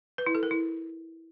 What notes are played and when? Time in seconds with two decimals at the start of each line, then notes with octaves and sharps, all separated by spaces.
0.18 B4
0.26 E4
0.35 A4
0.43 A#4
0.51 E4